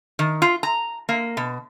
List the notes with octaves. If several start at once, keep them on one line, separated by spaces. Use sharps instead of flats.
D#3
F4
A#5
A#3
B2